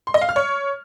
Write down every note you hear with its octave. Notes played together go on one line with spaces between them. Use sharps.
C6
D#5
F5
F6
C#5